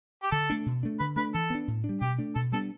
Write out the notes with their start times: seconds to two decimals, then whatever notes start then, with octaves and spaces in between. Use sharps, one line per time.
0.23 G4
0.32 D3 A4
0.50 A3 D4
0.66 B2
0.83 A3 D4
0.99 D3 B4
1.16 A3 D4 B4
1.34 E3 A4
1.50 B3 D4
1.68 A2
1.84 D4
1.89 G3
2.01 B2 G4
2.18 A3 D4
2.35 B2 A4
2.52 G3 B3 D4 A4